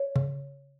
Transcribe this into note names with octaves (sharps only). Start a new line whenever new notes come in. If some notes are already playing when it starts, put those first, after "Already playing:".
Already playing: C#5
C#3